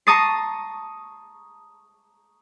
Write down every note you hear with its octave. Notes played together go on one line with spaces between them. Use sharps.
A5 A#5 C#6 D#6 A6 C7